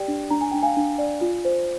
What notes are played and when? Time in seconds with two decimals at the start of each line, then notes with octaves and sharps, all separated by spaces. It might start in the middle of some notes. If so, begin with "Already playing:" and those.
Already playing: G4 D5 G5
0.08 D4
0.30 D4 A#5
0.41 G#5
0.51 D4 G5
0.63 F5 G#5
0.76 D4
0.98 D5
1.21 F4
1.45 C5